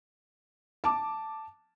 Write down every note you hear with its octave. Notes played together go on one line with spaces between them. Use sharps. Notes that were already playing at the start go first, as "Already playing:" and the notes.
A5 D6